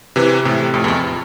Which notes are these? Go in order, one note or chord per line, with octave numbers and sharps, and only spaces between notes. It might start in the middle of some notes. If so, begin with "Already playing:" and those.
C3 E3
A2 C3
F2 A2
E2
F2